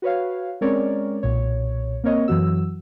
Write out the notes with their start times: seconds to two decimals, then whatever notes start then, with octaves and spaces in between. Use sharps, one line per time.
0.02 F#4 B4 C#5 F5
0.61 G#3 C4 C#4 A#4 C#5 D5
1.23 B1 A#2 C#5
2.04 A#3 C4 A#4 C#5 D#5
2.28 F#2 E3 F#3 F#4 E6